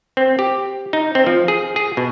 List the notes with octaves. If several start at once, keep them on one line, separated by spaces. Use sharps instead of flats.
C4
G4
D#4
C4
F3
G#4
G#4
B2